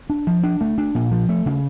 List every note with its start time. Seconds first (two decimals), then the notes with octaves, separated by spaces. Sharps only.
0.10 D4
0.27 F3
0.44 D4
0.61 A3
0.78 D4
0.95 A#2
1.11 F3
1.29 A3
1.46 C#3